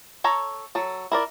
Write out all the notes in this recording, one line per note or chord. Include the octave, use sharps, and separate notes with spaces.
A4 C#5 A#5
F#3 A4
E4 A#4 D5